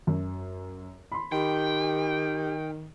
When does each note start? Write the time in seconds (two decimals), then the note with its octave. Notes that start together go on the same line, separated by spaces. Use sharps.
0.07 F#2
1.12 B5 C6
1.32 D#3 G4 G5